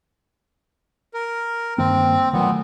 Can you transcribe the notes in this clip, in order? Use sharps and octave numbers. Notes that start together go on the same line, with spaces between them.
A#4
G2 D#3 A#3 C4
A#2 D#3 F#3 A3 B3